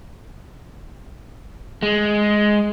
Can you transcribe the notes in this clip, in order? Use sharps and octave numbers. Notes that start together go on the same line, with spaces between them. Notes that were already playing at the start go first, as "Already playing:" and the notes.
G#3